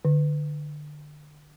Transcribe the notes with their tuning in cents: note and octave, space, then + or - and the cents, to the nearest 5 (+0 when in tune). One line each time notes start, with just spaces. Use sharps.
D3 +20